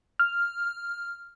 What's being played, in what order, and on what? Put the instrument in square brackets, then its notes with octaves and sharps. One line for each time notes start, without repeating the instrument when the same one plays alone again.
[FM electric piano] F6